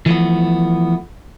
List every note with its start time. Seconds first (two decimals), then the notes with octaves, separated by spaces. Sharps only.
0.06 E3 F3 A3 B3